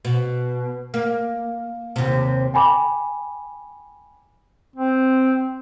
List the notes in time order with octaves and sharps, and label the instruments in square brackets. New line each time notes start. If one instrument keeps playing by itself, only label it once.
[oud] B2
A#3
D#2 C3
[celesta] G5 G#5 B5 D6
[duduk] C4